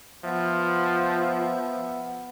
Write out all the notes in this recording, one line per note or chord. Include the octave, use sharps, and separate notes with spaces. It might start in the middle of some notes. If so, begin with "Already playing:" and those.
F3 B3 E5